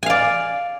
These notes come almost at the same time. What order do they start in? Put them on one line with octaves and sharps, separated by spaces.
G#5 F5 D5